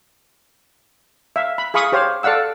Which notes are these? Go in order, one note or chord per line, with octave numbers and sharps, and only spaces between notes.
E5 F5
B5
G#4 F5 B5 C#6 D#6
G4 C5 C#5 F5
A4 D5 F5 F#5 E6